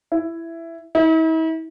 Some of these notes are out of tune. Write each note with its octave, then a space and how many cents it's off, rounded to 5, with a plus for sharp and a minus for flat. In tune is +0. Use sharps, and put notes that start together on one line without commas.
E4 +10
E4 -45